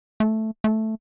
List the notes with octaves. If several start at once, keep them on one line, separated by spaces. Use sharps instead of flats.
A3
A3